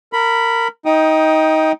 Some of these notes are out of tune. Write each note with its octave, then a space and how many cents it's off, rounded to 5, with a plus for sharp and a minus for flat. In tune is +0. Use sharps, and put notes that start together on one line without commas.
A#4 -20 B5 +0
D#4 +20 G5 +0 D#6 +0